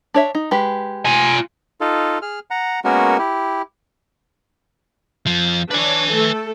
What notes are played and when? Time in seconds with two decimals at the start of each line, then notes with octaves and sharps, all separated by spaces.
0.14 D4 C#5 E5
0.35 D#4
0.51 G#3 G4 B4
1.06 F4 G#5
1.81 D#4 F4 A4
2.22 G#4 F6
2.51 F#5 A#5
2.85 G#3 A#3 B3 C#4 F#4 A#4
3.18 E4 G4
5.27 F2 F3
5.71 D4 B4 C#5 G#5
6.10 A3 A4